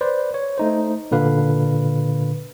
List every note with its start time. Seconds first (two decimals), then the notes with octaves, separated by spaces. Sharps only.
0.01 B4 C5 D5
0.34 C#5
0.58 A3 D#4 C5
1.11 A#2 D3 B4 F5